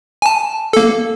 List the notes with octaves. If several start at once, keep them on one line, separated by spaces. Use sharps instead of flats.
G#5 A5
A#3 A4